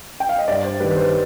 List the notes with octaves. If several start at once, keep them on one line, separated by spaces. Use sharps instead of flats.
G5
F5
D#5
G2 D5
C5
D#3 G3 B4
B4
C5